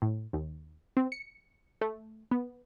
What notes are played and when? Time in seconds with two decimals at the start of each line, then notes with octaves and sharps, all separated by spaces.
0.02 A2
0.33 D#2
0.97 C4
1.12 C#7
1.81 A3
2.31 B3